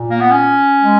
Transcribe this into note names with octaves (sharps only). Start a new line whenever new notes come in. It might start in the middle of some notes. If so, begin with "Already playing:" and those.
Already playing: A#2
A#3
B3
C#4
G#3